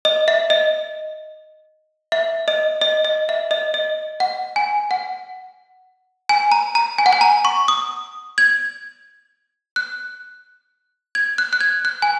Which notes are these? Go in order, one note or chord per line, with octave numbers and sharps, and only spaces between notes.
D#5
E5
D#5
E5
D#5
D#5
D#5
E5
D#5
D#5
F#5
G#5
F#5
G#5
A#5
A#5
G#5
F#5
G#5
A#5
C#6
D#6
G#6
F#6
G#6
F#6
F#6
G#6
F#6
G#5